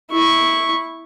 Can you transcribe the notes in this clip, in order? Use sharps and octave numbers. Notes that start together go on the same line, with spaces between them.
E4 C#6